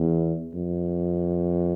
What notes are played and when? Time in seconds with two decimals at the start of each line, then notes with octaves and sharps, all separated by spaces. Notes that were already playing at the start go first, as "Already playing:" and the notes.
Already playing: E2
0.55 F2